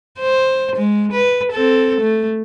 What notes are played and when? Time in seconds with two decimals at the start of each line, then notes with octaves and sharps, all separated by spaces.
0.20 C5
0.76 G#3
1.12 B4
1.52 C4 A4
2.01 A3